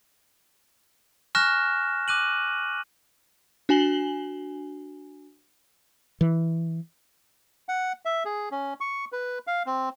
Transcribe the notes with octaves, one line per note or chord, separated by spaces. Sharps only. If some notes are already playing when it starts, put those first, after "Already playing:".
G#5 C#6 F6 F#6 A#6 E7
D6 F#6 D#7 F#7
D4 F#4 G#5 F#7 G7
E3
F#5
E5
G#4
C#4
C#6
B4
F5
C4